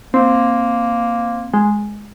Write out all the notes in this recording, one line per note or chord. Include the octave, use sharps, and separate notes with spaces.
A#3 C4
G#3